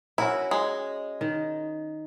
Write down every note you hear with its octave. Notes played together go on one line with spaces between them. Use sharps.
C#4 E4 F#4 A#4
G#3
D#3